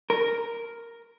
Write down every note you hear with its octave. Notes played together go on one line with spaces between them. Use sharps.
A#4